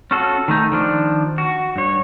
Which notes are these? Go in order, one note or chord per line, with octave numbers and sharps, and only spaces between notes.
C#4 F4 F#4 A4
D#3 A3 D#4
D#3 F3 D4
F#4
G2 C#5